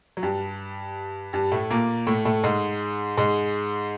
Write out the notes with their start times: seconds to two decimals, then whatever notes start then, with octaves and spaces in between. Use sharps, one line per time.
0.17 F#3
0.23 G2 G3
1.33 G2 G3
1.52 A2 A3
1.70 A#2 A#3
2.07 A2 A3
2.25 A2 A3
2.44 G#2 G#3
3.17 G#2 G#3